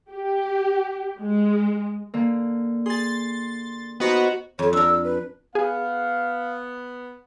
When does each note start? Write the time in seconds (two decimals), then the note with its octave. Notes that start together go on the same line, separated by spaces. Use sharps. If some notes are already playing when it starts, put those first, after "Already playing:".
0.11 G4
1.20 G#3
2.14 D3 A#3
2.86 G#4 C6 A6
4.00 B3 D#4 F#4 C5 A#5
4.59 F2 C#5
4.73 D4 A#4 E6
5.04 B4
5.55 B3 G#4 F5